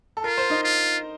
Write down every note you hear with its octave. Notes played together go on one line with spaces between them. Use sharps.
A4
F4 A#4
C5
D#4
F4